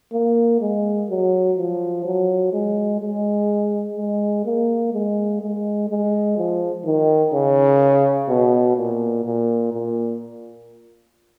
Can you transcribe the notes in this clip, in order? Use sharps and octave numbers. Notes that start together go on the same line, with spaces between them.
A#3
G#3
F#3
F3
F#3
G#3
G#3
G#3
A#3
G#3
G#3
G#3
F3
D#3
C#3
B2
A#2
A#2
A#2